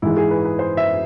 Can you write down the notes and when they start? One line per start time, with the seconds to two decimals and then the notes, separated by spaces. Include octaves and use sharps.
0.02 G#2 E3 G#3 E4
0.17 G#4
0.31 B4
0.45 B4
0.59 C5
0.77 E5